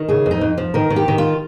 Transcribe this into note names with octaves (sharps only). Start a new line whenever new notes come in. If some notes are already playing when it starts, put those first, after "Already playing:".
Already playing: D#3
C#3 G#4
F2
D#4
F2
F3
D#3 A#4
D#3
G4
D#3
F4